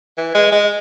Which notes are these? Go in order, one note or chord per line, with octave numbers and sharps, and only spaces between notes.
E3
G#3
G#3